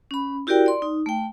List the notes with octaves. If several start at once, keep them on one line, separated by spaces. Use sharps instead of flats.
C#4 B5
E4 F#4 G4 A#4 D5 G5
D5 C6
D#4
A3 G5